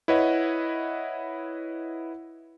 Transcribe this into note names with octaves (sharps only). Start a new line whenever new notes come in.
E4 B4 C#5 D#5 F#5